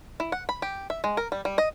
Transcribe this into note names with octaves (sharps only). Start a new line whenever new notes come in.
E4
F#5
B5
G4
E5
G#3
A#4
G3
G3
D#5